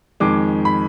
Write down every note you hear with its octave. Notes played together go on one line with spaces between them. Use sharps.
F2 D#3 G#3 D6
B5